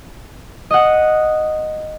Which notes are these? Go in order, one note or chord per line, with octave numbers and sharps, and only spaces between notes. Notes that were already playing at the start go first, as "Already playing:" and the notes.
D#5 F#5